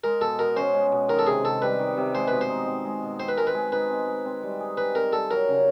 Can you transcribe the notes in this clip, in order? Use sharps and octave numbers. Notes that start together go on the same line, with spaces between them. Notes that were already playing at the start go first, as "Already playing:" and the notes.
G#3 A#4
B2 A4
B2 A#4
C#4 C5
G#3
B2
D#3 A#4
A4
C3 G#4
C3 A4
G3 B4
D#3
C3
G#3 C5
B2 B4
C5
D#4
C4
G#3
B2
C4 C5
B4
G#3 A#4
B4
G#3
D#4 B4
C4
G#3
C4
G3
G#4
D#4 B4
C4 A#4
G3 A4
F#3 A#4
C#3